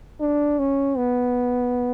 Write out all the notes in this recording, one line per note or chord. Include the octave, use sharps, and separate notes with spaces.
D4
C#4
B3